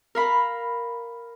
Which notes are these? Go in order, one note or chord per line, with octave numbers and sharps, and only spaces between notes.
A#4 F5 B5